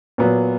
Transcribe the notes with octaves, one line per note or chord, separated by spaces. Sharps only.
A#2 F#3 B3